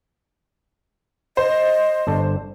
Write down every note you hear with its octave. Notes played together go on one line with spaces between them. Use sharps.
C5 D#5
G1 D4 A4